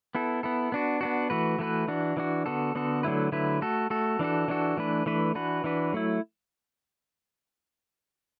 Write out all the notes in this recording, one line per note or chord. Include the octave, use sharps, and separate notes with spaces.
B3 E4 A4
B3 E4 A4
B3 D4 F#4
B3 D4 F#4
E3 A3 F#4 B4
E3 A3 F#4 B4
E3 D4 F#4
E3 D4 F#4
D3 B3 F#4 A4
D3 B3 F#4 A4
D3 F#3 A3 E4 B4
D3 F#3 A3 E4 B4
A3 F#4 A4
A3 F#4 A4
E3 D4 F#4 A4
E3 D4 F#4 A4
E3 A3 D4 B4
E3 A3 D4 B4
E3 D4 F#4 B4
E3 D4 F#4 B4
F#3 A3 E4